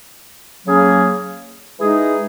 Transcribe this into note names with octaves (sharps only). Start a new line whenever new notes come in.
C#3 F#3 A#3 C#4 G#4
E3 G#3 D#4 G#4